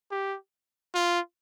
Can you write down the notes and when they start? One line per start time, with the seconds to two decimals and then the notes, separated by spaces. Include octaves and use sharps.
0.11 G4
0.95 F4